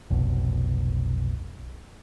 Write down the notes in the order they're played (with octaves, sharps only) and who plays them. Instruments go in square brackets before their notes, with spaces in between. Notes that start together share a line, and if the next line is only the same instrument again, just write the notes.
[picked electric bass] F1 B1